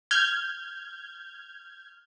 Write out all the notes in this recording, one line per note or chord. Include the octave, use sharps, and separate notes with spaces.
F6 G6 G#6